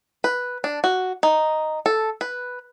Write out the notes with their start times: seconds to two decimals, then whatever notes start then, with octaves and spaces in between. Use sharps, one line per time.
0.24 B4
0.64 D4
0.84 F#4
1.23 D#4
1.86 A4
2.21 B4